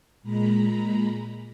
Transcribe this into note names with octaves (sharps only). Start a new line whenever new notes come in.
A#2 G#3 A#5 B5